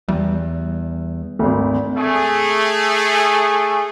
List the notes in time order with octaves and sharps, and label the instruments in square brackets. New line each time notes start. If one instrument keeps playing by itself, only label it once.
[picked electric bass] E2 [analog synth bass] G3
[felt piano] G#1 D2
[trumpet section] A3 G#4